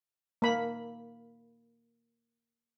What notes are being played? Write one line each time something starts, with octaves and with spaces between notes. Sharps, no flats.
A#3 B5